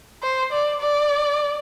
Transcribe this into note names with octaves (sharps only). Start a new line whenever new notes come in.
C5
D5
D5